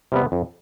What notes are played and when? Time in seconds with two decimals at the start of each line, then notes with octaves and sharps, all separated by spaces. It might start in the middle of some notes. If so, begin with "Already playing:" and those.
0.12 C3 G3 B3
0.32 F2